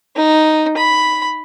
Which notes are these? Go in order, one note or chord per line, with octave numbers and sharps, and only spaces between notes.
D#4
B5